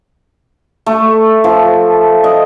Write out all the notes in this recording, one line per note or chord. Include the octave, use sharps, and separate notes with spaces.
A3
F3
D#5